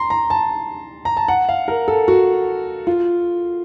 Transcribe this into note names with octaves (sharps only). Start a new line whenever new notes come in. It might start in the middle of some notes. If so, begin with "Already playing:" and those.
Already playing: A#5 C6
A#5
A5
A#5
A5
F#5
F5
A#4
A4
F#4
F4